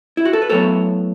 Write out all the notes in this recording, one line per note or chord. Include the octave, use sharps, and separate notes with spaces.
E4
F#4
A4
B4
A2 F#3 B3 A4 C#5